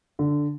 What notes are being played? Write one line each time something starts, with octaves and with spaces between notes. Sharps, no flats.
D3